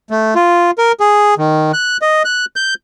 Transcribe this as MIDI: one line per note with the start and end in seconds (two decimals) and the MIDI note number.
0.10 0.34 57
0.35 0.71 65
0.78 0.92 70
1.00 1.34 68
1.38 1.72 51
1.73 1.97 90
2.02 2.23 75
2.25 2.45 90
2.56 2.74 91